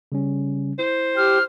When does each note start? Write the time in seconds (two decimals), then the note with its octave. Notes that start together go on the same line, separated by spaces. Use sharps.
0.12 C#3 G3 C#4
0.79 E4 C5
1.17 G4 F6